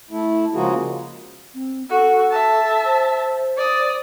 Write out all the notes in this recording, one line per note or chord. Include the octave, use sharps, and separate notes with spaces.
A3 E4
C#3 F3 G#3 A#3 F#4 G#4
C4
F#4 A4
E5 A5
C5
D5 D#6